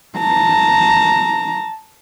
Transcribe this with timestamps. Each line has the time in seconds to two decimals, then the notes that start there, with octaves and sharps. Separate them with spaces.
0.19 A5 A#5